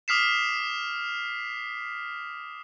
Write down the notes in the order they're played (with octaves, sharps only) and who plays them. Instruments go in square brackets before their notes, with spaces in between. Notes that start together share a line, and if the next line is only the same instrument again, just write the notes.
[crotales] D6 D#6 F6 B6 C7 E7